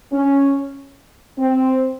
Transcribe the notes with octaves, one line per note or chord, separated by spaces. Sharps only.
C#4
C4